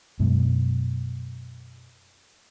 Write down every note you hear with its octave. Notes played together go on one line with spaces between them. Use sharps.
F#2 B2 G#3